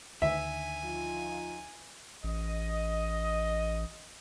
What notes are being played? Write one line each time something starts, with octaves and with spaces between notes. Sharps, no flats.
D2 D3 D#3 E5 G#5
F3 D#4 F4
A1 D#5